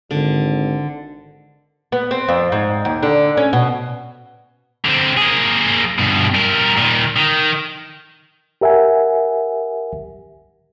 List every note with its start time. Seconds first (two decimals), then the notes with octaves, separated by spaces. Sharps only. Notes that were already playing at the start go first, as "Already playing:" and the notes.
0.11 G#1 D3
1.92 B3
2.11 C4
2.28 F2
2.52 G#2
2.85 D#2
3.03 D3
3.37 C#4
3.53 B2
4.85 D3 C4
5.17 A#3 G#4
5.99 G2 B2
6.34 G3 A#4
6.77 A#2 D#3
7.16 D#3
8.61 G4 A#4 E5 F#5 G#5